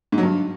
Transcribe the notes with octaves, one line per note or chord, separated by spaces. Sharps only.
G#2
F#3
G2